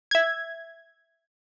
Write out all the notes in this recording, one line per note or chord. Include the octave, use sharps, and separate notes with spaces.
E5 G#6